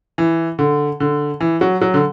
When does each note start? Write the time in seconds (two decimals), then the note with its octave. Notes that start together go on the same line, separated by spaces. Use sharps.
0.18 E3
0.59 D3
1.00 D3
1.40 E3
1.61 F#3
1.81 F#3
1.94 D3